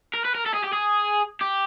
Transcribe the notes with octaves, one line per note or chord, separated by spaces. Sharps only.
A#4
B4
A#4
A4
G#4
G4
G#4
G4